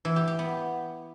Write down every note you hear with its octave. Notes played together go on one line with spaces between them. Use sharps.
E3
G4
G4
B3